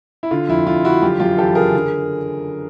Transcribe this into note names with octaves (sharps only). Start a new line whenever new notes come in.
E4
D3 F4
F2 E4
F2 F4
D3 E4 F#4
F#2 F4 G4
F#2 F4 G4
E3 G4 A4
C#3 G#4 A#4
D3